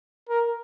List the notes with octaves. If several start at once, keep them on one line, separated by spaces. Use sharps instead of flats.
A#4